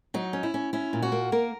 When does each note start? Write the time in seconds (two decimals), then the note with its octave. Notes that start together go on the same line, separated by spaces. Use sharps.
0.14 F#3 D#4
0.33 C#4
0.43 E4
0.54 C#4
0.73 C#4 E4
0.93 A#2
1.02 F#4
1.12 A#3
1.32 A#3 A#4